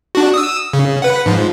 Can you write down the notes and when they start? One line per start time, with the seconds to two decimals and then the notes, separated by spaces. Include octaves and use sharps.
0.15 D4 F#4
0.34 D#6 E6
0.73 C#3
1.02 B4 F#5
1.26 G#2 F3